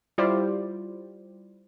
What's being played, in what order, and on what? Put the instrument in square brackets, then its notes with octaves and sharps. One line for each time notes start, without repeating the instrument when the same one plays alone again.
[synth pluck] G3 E4 F4 G4 C5 D5